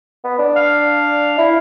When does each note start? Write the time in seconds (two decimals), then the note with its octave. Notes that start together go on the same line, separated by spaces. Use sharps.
0.24 B3
0.39 D4
0.56 F5
1.38 E4